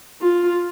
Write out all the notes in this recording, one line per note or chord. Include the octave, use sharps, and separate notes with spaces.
F4